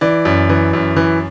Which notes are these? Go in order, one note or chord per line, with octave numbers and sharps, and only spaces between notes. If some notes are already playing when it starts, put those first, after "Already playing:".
E3 D5
F#2
E3
F#2
E3